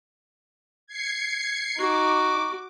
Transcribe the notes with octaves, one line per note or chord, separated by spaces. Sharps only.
G#6 C7 C#7
D#4 F#4 D6